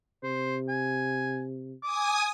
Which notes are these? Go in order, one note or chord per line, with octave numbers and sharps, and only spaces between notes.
C3 C5
G#5
G#5 D6 D#6